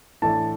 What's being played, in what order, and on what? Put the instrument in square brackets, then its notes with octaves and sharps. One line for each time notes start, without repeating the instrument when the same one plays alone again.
[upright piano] A2 E3 A3 D4 [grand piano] A5